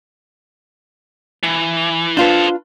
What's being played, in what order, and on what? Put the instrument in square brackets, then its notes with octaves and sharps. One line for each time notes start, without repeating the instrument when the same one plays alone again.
[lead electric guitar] E3
[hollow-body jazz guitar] D4 F4 B4 [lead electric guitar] A4 C5